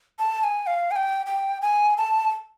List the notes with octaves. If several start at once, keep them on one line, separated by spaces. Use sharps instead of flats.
A5
G#5
F5
G#5
G5
G5
G#5
A5